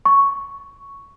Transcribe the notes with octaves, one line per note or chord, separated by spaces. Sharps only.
C#6